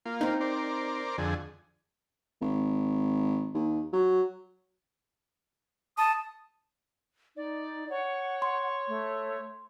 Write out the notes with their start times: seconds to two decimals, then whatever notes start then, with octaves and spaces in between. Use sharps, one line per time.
0.06 A#3 F4
0.21 C4 D#4
0.41 A#4 C5 D5
1.18 F2 D3 G#4
2.41 G#1
3.54 D#2
3.93 F#3
5.98 A5 D#6
7.37 D#4 D5
7.90 C#5 F#5
8.42 C6
8.88 A3